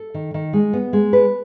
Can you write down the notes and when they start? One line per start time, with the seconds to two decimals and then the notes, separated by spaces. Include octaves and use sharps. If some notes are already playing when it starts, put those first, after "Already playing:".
Already playing: A4
0.14 D#3
0.34 D#3
0.53 G#3
0.73 B3
0.93 G#3
1.13 B4